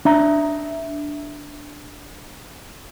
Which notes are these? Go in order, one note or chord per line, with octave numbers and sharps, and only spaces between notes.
D4 E5 A#5